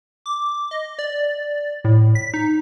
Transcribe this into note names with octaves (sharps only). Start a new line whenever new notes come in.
D6
D#5
D5
A2
B6
D#4